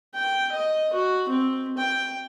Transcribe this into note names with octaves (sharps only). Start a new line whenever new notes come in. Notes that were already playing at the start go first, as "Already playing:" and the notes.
G5
D#5
F#4
C4
G5